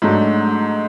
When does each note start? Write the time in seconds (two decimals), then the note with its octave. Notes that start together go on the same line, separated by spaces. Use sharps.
0.02 G#2 F#3 A3 D4